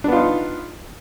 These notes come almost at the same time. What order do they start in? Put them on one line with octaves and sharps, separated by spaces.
D4 B3 F4 D#4